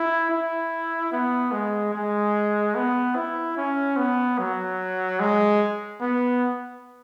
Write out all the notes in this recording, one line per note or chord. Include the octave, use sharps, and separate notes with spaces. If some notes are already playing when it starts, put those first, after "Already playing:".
Already playing: E4
E4
B3
G#3
G#3
B3
E4
C#4
B3
F#3
G#3
B3